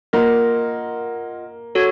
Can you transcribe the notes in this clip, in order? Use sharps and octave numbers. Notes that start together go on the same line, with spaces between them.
A#3 F4 A#4 D#5 F#5
F#4 A4 C#5